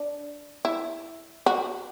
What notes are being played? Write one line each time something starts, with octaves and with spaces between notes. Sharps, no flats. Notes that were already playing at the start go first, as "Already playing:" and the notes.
Already playing: D4
E4
F#4